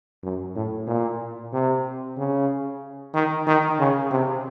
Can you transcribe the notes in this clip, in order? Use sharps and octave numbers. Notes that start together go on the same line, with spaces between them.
F#2
A2
A#2
C3
C#3
D#3
D#3
C#3
C3